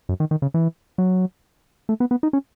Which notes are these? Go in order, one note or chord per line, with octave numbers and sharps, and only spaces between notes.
F#2
D#3
D#3
C#3
E3
F#3
A3
B3
B3
D#4
C#4